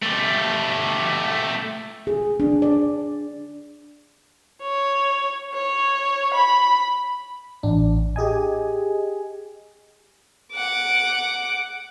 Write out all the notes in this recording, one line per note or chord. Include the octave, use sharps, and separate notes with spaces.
A3 G4
G#4
D4
D5
C#5
C#5
B5
A1 D4
G4 G#4 D#5 G#5
F#5 D6